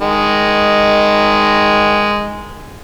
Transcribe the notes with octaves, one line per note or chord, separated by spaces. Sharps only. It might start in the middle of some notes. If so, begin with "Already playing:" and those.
D#3 G#3